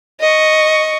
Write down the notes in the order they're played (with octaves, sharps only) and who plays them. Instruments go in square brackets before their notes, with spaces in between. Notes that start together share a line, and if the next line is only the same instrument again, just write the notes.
[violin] D#5 C#6